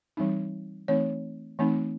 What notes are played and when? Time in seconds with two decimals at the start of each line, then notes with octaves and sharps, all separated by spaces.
0.17 E3 G3 C4 D#4
0.88 E3 A3 C4 D#4 C#5
1.59 E3 A3 C4 D#4